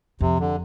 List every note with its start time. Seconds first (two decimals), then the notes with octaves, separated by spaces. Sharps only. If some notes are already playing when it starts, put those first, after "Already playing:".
0.21 F2 C3
0.39 D3